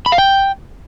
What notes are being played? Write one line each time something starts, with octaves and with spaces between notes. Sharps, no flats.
B5
F5
G5